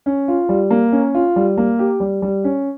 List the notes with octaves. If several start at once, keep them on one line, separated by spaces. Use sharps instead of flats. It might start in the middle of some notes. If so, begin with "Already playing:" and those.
C#4
F4
G3
A#3
C#4
F4
G3
A#3
G4
G3
G3
C#4